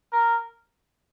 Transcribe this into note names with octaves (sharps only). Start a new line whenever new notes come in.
A#4